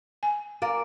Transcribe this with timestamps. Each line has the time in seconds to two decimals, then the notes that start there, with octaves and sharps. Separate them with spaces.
0.23 G#5
0.62 A#3 D5